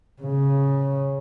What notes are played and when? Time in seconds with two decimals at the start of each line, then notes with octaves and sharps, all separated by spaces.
0.22 C#3